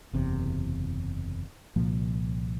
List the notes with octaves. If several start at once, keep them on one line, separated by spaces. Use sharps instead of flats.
F#1 E2 C3
C2 A#2 F3 A#3